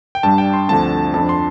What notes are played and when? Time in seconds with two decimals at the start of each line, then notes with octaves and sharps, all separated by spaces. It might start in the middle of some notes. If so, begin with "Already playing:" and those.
0.15 G5
0.23 G2 G3 D4 A5
0.38 G5
0.53 C6
0.68 D2 D3 F3 A3 C4 A5
1.14 F2 F3 D4 A5
1.29 C6